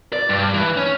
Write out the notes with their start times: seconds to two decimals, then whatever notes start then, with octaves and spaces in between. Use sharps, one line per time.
0.13 D5
0.29 G2
0.54 E3
0.77 C#4